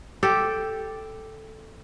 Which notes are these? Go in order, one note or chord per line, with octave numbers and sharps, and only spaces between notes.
G4 A4